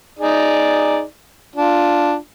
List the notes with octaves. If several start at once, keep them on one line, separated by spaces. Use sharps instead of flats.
D#4 G#4 D5
D4 F4